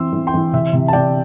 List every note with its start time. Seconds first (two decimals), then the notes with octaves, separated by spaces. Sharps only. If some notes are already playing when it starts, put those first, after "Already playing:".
Already playing: E3 C4 C6 E6
0.13 E3
0.27 G5 C6
0.34 E3
0.53 C3 E5
0.73 C3
0.88 A5
0.93 C3 D5 G5